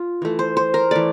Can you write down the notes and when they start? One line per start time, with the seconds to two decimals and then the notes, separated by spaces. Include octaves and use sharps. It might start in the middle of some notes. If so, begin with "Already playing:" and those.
Already playing: F4
0.22 E3 A3
0.39 C5
0.57 C5
0.74 A#4
0.91 E3 A3 D5